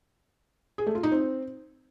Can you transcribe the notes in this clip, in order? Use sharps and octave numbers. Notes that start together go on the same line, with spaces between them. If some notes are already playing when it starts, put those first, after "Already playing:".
G#4
A3
F4
D#4
C4